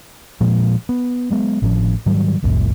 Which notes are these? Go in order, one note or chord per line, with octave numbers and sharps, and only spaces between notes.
A#2 F3 G#3
B3
F#3 G#3 B3
G#1 A2 F3 C#4
G#2 D#3 F#3 G3
G#1 C#2 F#2 A#2